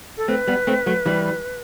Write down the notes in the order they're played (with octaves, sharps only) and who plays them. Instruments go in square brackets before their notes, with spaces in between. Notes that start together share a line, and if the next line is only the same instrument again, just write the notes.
[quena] A4
[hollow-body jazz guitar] A3 C4 [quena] B4
[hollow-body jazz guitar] G3 B3
A3 C4
F#3 A3
E3 G3